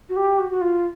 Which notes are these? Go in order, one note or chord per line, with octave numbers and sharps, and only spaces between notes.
F#4
G4
F#4
F#4
F4